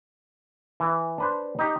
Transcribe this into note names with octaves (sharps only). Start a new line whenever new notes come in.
E3
D4 B4 C5
D#4 G4